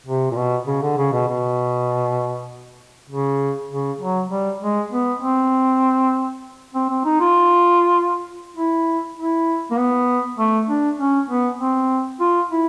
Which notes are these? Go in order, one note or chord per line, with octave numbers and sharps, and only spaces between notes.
C3
A#2
B2
C#3
D3
C#3
B2
B2
C#3
C#3
F#3
G3
G#3
B3
C4
C4
C4
D#4
F4
E4
E4
A#3
B3
A3
D4
C#4
B3
C4
F4
E4